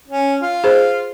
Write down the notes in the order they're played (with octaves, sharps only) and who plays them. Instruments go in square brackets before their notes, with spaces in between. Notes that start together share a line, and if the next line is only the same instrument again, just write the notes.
[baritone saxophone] C#4
F4
[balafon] G#4 C5